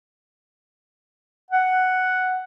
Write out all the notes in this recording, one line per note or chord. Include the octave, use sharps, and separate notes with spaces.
F#5